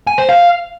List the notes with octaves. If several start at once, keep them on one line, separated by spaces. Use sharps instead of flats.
G#5
C5
F5